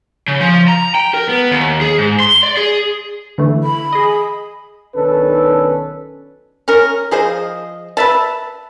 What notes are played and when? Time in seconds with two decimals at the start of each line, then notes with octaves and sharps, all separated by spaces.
0.28 C#3
0.41 F3
0.68 A#5
0.95 G5
1.14 A#4
1.29 B3
1.51 D#2
1.81 G#4
1.98 G#2
2.20 C6
2.43 D5
2.57 G#4
3.38 D3 E3 A3
3.63 B5
3.93 G#4 D#5
4.95 B1 D#3 C#4 D4 A4 B4
6.68 C#4 A#4
7.11 F3 G#4 C5 D#5
7.97 B4 E5 A5